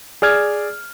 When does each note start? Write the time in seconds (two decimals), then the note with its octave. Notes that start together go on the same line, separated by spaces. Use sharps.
0.22 G#4 D5 F6 G#6